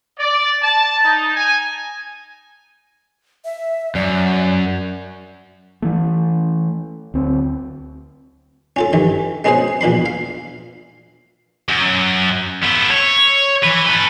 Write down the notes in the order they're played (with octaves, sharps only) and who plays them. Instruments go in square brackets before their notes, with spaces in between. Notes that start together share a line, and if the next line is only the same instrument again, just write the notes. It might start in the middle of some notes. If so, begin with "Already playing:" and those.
[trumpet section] D5
A5
D#4
G#5
[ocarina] E5
[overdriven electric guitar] F#2 [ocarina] D5
[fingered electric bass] E3 A3
D2 C4
[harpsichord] C#4 F4 A4
G2 D#3 E3
G#3 B3 C#4 F#4 G#4 C5
E2 A#2 D4 B5 C6
F5
[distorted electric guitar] F#2
B3 A4
C#5
E3 B4
A4 B4